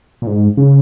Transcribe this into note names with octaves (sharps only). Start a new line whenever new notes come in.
A#2
G#2
C#3